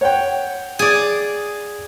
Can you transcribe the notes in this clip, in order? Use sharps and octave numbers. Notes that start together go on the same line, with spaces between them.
C#5 F#5 G5
G#4 D5